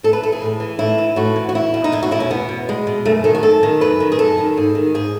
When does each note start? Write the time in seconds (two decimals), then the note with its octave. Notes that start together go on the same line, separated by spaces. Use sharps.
0.03 A2 A4
0.13 B4
0.23 E3 A4
0.32 G#4
0.42 A2
0.60 E3
0.79 A2 E4
0.98 E3
1.16 A2 F#4
1.36 E3
1.49 F#4
1.54 E2 E4
1.74 B2
1.84 D#4
1.92 E2 E4
2.03 F#4
2.11 B2 E4
2.20 C#4
2.30 E2 B3
2.49 B2
2.68 E2 G#3
2.87 B2
3.05 F#2 A3
3.24 D#3 A4
3.35 F#4
3.43 F#2 A4
3.63 D#3
3.81 F#2 B4
4.00 D#3
4.12 G#4
4.19 F#2 A4
4.38 D#3
4.57 G#2 G#4
4.75 D#3
4.94 G#2 G#4